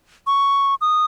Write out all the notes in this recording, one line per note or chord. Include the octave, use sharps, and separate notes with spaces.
C#6
D#6